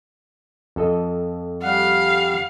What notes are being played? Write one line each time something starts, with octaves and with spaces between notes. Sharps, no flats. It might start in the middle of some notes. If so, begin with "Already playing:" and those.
F2 A4 D#5
G3 F5 F#5